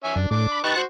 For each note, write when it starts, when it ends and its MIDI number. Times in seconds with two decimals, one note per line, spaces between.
0.04 0.15 61
0.04 0.15 76
0.04 0.15 80
0.16 0.26 42
0.16 0.28 62
0.31 0.47 45
0.31 0.63 62
0.31 0.63 86
0.52 0.60 83
0.64 0.73 63
0.64 0.73 67
0.64 0.73 71
0.64 0.82 81
0.64 0.82 85
0.64 0.82 90
0.76 0.84 66
0.76 0.84 72